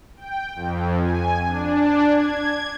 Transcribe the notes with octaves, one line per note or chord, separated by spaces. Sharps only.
G5
F2
G#5
D4
G#6